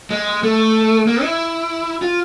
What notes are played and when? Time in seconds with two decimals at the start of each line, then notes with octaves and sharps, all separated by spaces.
0.11 G#3
0.43 A3
1.07 A#3
1.23 E4
2.02 F4